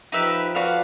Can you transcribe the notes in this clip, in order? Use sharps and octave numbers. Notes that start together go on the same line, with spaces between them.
F3 D#4 G4 B4 E5
F#4 B4 D5 F5